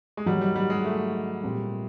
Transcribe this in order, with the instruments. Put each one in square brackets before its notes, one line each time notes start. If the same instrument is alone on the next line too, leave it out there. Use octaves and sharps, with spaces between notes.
[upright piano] G#3
[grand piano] G#2 D#3 F#3 [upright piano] G3
[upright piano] G3
G3
G#3
A3
[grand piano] A#2 G3 C4